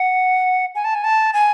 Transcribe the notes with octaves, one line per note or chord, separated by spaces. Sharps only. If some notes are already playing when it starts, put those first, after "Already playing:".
Already playing: F#5
G#5
A5
G#5
A5
G#5